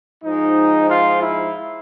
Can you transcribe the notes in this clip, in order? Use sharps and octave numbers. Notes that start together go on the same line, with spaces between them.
G#2 F3 G#3 D#4
F4
E4